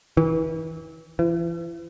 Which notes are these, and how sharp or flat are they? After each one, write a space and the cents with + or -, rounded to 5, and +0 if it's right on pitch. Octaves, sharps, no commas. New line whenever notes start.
E3 -30
E3 +40